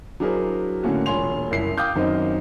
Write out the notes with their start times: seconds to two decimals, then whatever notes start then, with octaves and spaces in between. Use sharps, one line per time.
0.20 F#3 D4 E4 G#4 A#4 C5
0.83 A2 D3 A3 A#3 C#4 F#4
1.06 E1 A#2 C#5 G#5 C6 F7
1.51 F#1 C2 E4 C7
1.78 F5 G5 D6 D#6 F6 G6
1.96 F#2 D#3 C4 D#4